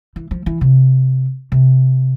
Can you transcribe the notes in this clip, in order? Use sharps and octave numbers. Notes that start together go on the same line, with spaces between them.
E3
F3
E3
C3
C3